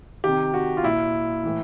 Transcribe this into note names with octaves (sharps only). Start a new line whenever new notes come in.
C3 D#3 G4
F#4
F4
A#2 E4
A2 E3